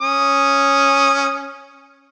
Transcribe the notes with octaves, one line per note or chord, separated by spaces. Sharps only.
C#4 D#6